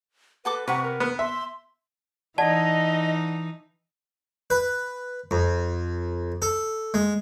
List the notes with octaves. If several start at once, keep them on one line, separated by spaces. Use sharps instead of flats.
F#4 A4 B4 D6
C3 B4 F#5 A#5 C#6
A#4
B3
E5 C6
E3 D#4 D5 D#5 F#5 A5
B4
F2
A4
G#3